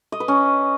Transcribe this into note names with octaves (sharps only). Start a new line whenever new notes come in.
D#5
B4
C#4